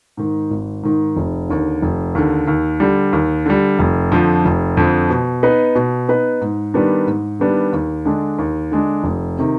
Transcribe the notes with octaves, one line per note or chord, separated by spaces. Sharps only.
G#2 D#3
G#1
G#2 D#3
F1
D#2 D3
F1
D#2 D3
D#2
D3 G3
D#2
D3 G3
F1
F2 D3 F3
F1
F2 D3 F3
B2
B3 D#4 B4
B2
B3 D#4 B4
G#2
D#3 G3 B3 D4
G#2
D#3 G3 B3 D4
D#2
D3 G#3 D4
D#2
D3 G#3 D4
F1
C3 D#3